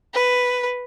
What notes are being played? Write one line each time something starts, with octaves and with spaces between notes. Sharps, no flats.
B4